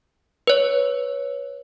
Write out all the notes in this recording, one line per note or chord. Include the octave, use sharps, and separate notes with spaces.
B4 C#5